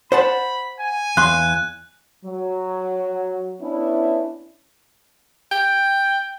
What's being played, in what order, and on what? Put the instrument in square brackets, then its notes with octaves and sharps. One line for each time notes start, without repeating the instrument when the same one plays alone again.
[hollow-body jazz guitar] C5 F#5 A5 [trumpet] B5
[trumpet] G#5
[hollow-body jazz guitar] E2 F5 C6 [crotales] F#6
[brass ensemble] F#3
B3 C#4 D4 E4
[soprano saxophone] G5